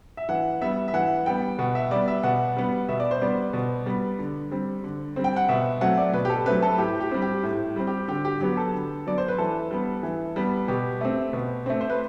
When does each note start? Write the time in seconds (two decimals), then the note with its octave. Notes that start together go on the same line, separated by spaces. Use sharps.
0.17 E5
0.29 E3 F#5
0.61 G3 B3 E5
0.88 E5
0.94 E3 F#5
1.26 G3 B3 G5
1.59 B2 F#5
1.75 E5
1.91 G3 B3 D5
2.08 E5
2.23 B2 F#5
2.56 G3 B3
2.89 B2 E5
3.00 D5
3.11 C5
3.21 G3 B3 D5
3.53 B2
3.86 G3 B3
4.19 D3
4.51 G3 C4
4.84 D3
5.16 G3 C4
5.24 G5
5.36 F#5
5.49 B2 E5
5.81 F#3 A3 C4 F#5
5.97 D5
6.13 B2 B4
6.25 G4
6.30 A4
6.46 F#3 A3 C4 B4
6.62 A4
6.78 A2 G4
7.00 G4
7.11 G3 C4
7.22 G4
7.43 A2
7.76 G3 C4
7.87 G4
8.08 D3 G4
8.25 G4
8.41 F#3 B3 G4
8.57 A4
8.74 D3
9.06 F#3 B3 D5
9.18 C5
9.28 B4
9.38 E3 A4
9.71 G3 B3
10.03 E3
10.36 G3 B3
10.68 B2 G4
11.01 A3 C4
11.33 B2
11.66 A3 C4
11.81 C5
11.90 B4